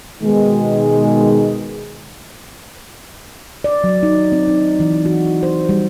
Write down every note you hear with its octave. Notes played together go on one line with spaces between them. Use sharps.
B2 D#3 G#3
D5
F#3
D#4
C4
D#4
E3
F#4
C5
G3